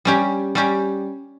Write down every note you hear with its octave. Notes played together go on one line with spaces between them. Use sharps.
G3 C#4 G4
G3 C#4 G4